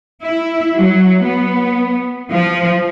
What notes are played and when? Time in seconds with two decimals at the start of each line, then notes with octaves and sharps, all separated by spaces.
0.22 E4
0.78 F#3
1.25 B3
2.30 F3